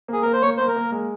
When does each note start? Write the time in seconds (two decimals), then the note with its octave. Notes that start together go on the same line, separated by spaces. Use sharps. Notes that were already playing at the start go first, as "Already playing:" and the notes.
0.08 A#3 G#4
0.23 A#3 A#4
0.33 C5
0.42 A#3 C#5
0.57 A#3 C5
0.68 A#4
0.76 A#3
0.92 G#3